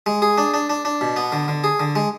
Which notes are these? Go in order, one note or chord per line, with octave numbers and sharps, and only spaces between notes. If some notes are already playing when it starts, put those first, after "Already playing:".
G#3
G#4
D4
D4
D4
D4
B2
B3
D3
D3
G#4
D3
G#3